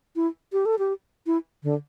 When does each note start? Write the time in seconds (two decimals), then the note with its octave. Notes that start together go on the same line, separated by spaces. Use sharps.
0.16 E4
0.53 G4
0.66 A4
0.79 G4
1.27 E4
1.63 D3